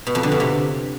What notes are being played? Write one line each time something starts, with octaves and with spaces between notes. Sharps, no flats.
B2
F2
D3
B2
C3